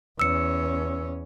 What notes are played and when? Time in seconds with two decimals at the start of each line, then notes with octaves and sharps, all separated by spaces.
0.20 E2 C#4 E6 C#7